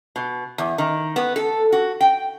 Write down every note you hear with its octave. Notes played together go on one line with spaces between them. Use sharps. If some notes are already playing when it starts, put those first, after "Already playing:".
B2
E2
D#3
B3
A4
F#4
G5